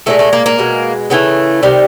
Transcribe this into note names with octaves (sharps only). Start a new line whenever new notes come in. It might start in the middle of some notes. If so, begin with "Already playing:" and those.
A#2 F3 G#3 A3
A3
A#3
A#3
B2 G#3
C#3 E3 A3 B3
C3 D#3 G3